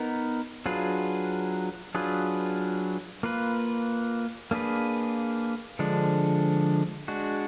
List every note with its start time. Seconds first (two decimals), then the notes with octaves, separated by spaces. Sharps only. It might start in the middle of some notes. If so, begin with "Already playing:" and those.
Already playing: B3 D#4 A#4
0.66 F#3 D4 F4 G#4 B4
1.95 F#3 D4 F4 G#4 B4
3.23 A#3 F4 B4
4.51 A#3 D4 G#4 B4
5.79 D3 F3 G#3 D4
7.08 G#3 D4 F#4